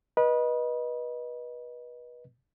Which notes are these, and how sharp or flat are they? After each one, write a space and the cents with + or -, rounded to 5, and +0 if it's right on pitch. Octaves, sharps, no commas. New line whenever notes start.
B4 -30 D#5 -5